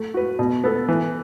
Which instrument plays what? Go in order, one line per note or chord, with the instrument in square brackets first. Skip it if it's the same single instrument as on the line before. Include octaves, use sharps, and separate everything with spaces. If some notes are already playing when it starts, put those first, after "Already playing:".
Already playing: [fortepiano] A3
F#4 B4
B2
B3 A4
E3